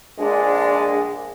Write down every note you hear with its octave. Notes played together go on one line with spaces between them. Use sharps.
A#1 G#3 D4